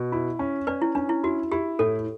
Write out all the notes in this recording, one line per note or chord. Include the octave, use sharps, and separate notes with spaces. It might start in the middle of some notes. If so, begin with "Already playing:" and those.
Already playing: B2
E4
C#4
C#4 B4 D5
E4
C#4 D4
E4
E4 F#4
E4 G4
A2 A4 C#5